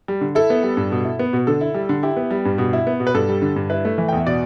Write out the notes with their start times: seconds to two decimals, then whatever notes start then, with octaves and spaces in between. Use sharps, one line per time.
0.08 G3
0.21 D3
0.35 E4 A4
0.50 B3
0.63 G3
0.77 G2
0.92 B2
1.05 E4
1.19 B3
1.33 B2
1.47 D3 A4
1.61 E4
1.74 G3
1.89 D3
2.03 E4 G4
2.17 B3
2.31 G3
2.45 G2
2.58 B2
2.73 E4
2.87 B3
3.00 B2
3.07 B4
3.14 G2 A4
3.29 G3
3.42 D3
3.56 G2
3.70 E4 B4
3.85 A3
3.98 E3
4.08 G5
4.13 E2
4.18 E5
4.26 B2 D5